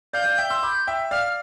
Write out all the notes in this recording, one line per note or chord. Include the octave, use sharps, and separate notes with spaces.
D5 F5 G6
D5 F5
E5 G5
C6 E6
B5 D6
E5 G5
D5 F5 F6